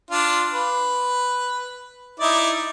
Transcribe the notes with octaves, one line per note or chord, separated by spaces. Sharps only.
D4 F4
B4
D#4 E4 D5